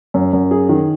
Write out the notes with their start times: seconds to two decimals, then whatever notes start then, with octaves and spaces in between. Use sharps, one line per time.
0.14 F#2
0.33 F#2
0.51 G#4
0.69 D#3